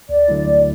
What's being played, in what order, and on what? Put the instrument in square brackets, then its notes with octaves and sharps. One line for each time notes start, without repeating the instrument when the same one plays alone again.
[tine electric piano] D2 [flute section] D5
[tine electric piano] D3 F#3 A3 E4
D2